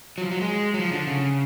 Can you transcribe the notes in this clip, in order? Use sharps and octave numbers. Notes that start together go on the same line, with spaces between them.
F#3
F3
F#3
G#3
F#3
F3
D3
C#3